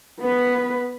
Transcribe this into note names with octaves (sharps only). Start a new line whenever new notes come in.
B3 B4